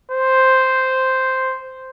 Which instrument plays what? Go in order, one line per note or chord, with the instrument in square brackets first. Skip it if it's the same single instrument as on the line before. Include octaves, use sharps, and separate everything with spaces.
[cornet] C5